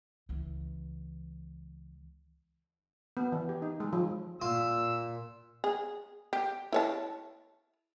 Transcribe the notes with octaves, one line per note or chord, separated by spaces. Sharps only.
C#2 E3
B3
E3
G4
D#4
G#3
F3
A#2 F4 E6
G#4
G4
E4 C#5 A5